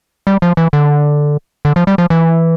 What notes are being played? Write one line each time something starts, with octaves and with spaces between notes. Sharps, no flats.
G3
F3
E3
D3
D3
F3
G3
F3
E3